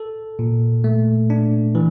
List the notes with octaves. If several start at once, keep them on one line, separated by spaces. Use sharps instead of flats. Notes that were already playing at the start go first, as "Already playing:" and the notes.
Already playing: A4
A#2
A3
D4
E3